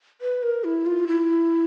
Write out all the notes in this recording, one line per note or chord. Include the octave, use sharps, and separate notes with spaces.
B4
A#4
E4
F4
E4